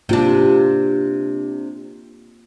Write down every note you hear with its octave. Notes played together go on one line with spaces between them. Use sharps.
C3 A#3 D4 F4